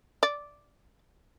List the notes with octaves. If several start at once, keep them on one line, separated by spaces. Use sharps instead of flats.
D5